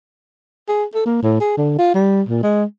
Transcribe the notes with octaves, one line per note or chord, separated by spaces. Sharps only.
G#4
A4
A#3
A2
G#4
D3
F4
G3
A#2
G#3